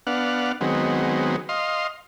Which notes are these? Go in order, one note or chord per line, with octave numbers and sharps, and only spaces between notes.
B3 D4 F5 F#5
D#3 F#3 G#3 B3 C4
D#5 F5 C6